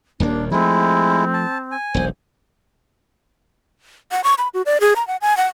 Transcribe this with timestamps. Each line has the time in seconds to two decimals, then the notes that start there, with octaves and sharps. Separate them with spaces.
0.20 D#1 D#2 A#3 D4
0.52 F3 G#3 A3 C4 E4
1.34 A5
1.72 G#5
1.94 E1 B1 C5
4.11 F#5
4.24 C#6
4.38 B5
4.54 F#4
4.66 D5
4.81 G#4
4.96 A#5
5.07 F#5
5.22 G#5
5.37 F#5